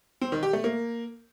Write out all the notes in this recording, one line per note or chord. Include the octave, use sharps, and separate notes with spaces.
C4
D#3
G4
A3
A#3